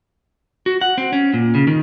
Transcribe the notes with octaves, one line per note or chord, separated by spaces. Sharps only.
F#4
F#5
C4
C#4
A#2
C#3
D#3